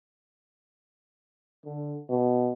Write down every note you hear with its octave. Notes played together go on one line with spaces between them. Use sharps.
D3
B2